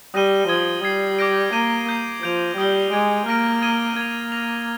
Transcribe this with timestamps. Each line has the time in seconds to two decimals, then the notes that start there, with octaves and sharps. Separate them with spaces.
0.14 G3 D#6 A#6 D#7 G7
0.48 F3 D#6 G#6 D#7 G7
0.83 G3 D#6 G#6 C7
1.19 D6 G6 A#6 D7
1.53 A#3 D6 G6 A#6 D#7 G7
1.87 D#6 G6 C7
2.22 F3 G6 D7 F7
2.57 G3 D#6 A#6 D7 G7
2.92 G#3 D6 G#6 D7
3.26 A#3 F6 A#6 D7
3.62 D#6 G#6 D#7 G7
3.96 A#3 G#6 D7 F7
4.31 F6 A#6 F7